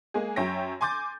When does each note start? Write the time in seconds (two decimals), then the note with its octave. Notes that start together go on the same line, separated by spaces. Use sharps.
0.14 G#3 A#3 G#4
0.36 F#2 C#5 E5 G5 A#6
0.81 G#5 C6 D6 G6 A6